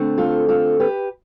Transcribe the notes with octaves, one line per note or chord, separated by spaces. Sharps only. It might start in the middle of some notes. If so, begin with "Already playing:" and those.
Already playing: D3 A3 C4
F4 A4
F4 A4
G4 B4